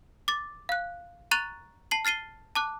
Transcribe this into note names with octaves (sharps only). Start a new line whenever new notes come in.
D6 A6
F5 F#6
A#5 C#6 F#6 A6 D#7 F7
A5 C7 F#7
F6 A6 C7 D#7 G7
A5 D6 F#6